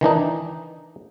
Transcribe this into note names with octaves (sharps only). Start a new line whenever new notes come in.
D#3 E3 D4 D#4